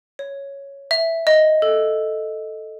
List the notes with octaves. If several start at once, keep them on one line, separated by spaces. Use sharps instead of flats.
C#5
E5
D#5
A4